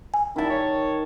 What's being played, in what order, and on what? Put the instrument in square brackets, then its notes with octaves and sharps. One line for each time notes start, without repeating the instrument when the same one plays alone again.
[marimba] G#5
[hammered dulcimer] D#3 A5 [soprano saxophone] E4
[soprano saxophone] C#5